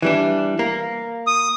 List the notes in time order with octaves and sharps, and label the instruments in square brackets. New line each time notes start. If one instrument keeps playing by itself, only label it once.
[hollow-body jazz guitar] E3 G3 D4
A#3
[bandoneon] D#6